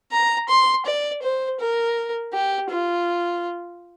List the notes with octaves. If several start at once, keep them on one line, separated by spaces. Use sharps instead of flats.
A#5
C6
D5
C5
A#4
G4
F4